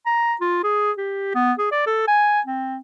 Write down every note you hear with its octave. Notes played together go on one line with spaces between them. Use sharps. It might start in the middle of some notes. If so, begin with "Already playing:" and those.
A#5
F4
G#4
G4
B3
G#4
D5
A4
G#5
C4